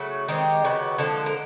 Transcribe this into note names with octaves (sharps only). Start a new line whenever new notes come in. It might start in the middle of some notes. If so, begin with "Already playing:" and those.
Already playing: C#3 F#3 A3
D#3 G#3 C4 G4
C#3 F#3 B3
D3 F3 G#3 A4
A#4